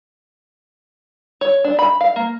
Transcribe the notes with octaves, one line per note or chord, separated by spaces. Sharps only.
C#5
D4
B5
F5
A#3